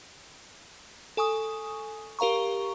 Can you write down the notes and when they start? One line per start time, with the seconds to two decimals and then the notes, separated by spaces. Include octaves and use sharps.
1.17 A4 G#5 C#6 D#6
2.19 G4 A#4 F5 A#5 C#6